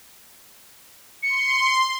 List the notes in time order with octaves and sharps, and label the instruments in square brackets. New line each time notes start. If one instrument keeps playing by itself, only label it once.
[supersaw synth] C6 [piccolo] C#7